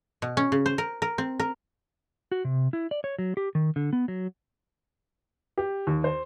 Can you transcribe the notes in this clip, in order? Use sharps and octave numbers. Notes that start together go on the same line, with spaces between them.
B2
C#4
C#3
C5
A#4
A#4
C4
A#4
F#4
C3
E4
D5
C#5
F#3
G4
D#3
D3
B3
F#3
G4
D#2
C5